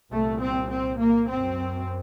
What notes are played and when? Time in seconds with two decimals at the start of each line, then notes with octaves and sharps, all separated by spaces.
0.11 C2 A#2 A3
0.41 C4
0.69 C4
0.98 A#3
1.28 F#2 C4